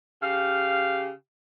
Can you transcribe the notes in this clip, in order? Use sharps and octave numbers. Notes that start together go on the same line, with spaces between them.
C#3 G4 F5